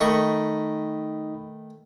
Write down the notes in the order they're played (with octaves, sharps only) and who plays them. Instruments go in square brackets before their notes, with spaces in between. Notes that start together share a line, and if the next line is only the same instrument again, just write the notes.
[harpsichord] D#3 A3 C#6 [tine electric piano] D#4 D#5 B5